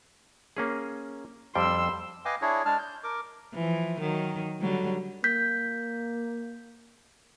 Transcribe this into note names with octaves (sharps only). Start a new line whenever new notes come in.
A#3 C#4 G#4
F2 G3 G5 C6 E6
B4 D#5 F5 G5 G#5 D6
D4 E4 G#4 C#5
G#3 D4 A5 F6
G6
A#4 D6
E3 F3
D#3 F#3
D3 F#3 G3
A#3 G6 B6